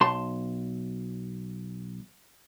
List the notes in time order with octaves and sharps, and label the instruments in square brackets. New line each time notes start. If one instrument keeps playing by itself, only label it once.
[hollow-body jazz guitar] B1 A5 C6